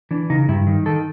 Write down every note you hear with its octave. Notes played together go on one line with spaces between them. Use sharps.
E3 D4
C#3 D#4
G2 E4
D#3
D#3 A4